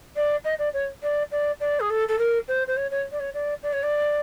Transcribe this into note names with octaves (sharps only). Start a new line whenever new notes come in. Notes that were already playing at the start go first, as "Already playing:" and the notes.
D5
D#5
D5
C#5
D5
D5
D5
G#4
A4
A4
A#4
C5
C5
C#5
C#5
D5
C#5
D5
D5
C#5
D5